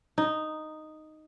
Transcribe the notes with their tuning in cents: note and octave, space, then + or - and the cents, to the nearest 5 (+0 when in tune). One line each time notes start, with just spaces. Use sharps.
D#4 -5